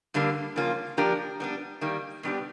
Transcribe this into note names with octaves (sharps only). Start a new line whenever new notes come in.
G2 D3 G3 A#3
C#3 F3 A#3 C#4 F4
F3 A#3 D4 G4 A#4
G3 B3 D4
D#3 G3 A#3
B2 G3 B3 D4 G4